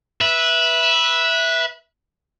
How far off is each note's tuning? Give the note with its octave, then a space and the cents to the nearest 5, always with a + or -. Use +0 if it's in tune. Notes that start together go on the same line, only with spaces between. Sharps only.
B4 -15 E5 +0